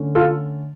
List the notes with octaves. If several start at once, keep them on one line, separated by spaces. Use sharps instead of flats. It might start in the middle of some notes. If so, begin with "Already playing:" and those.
Already playing: D3 A3 C#4
F4 A4